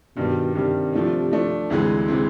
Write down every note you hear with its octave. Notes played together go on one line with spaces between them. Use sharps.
G2 B2 D#3 G3
G2 C3 D#3 G3
F3 A3 D4
F3 A3 D4
D2 C3 E3 G#3 C4
C3 E3 G#3 C4